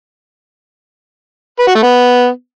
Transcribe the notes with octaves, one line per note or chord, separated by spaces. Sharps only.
B4
F#4
A3
B3